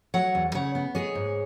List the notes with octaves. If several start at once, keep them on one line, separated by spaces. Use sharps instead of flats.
F#3 C#5 F#5
E2
C#3 C#5 F#5
B3
G#3 G#4 C#5
G#2